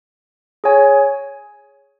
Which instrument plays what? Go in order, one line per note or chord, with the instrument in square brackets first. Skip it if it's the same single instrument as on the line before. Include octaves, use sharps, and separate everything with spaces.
[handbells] G#4 C#5 G#5